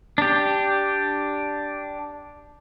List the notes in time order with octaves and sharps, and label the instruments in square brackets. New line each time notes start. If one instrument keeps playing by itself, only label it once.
[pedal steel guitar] D4 G4